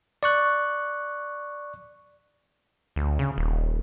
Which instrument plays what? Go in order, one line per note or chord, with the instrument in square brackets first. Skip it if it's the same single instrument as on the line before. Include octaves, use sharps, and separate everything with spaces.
[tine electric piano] D5 C#6 F#6
[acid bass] D2
C#3
D#1